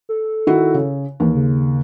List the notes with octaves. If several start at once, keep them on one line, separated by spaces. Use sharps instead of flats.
A4
D#3 E4 F#4
C#3
D#2 E3
C#3